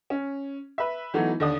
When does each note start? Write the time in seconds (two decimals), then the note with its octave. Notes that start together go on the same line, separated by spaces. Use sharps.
0.10 C#4
0.78 B4 E5
1.14 E3 F#3 A3 B3 D#4 F#4
1.40 D#2 D3 D4 D#6